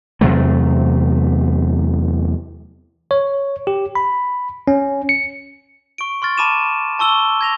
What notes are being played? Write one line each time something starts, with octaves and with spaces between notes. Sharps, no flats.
E2 C3 F#3 A3
C#5
G4
B5
C#4
C#7
C#6 D7
C6 C#6 F6 A6
A5 B5 D6 D#7 E7
A5 C#6 E6 G7
G#6 A#6 F7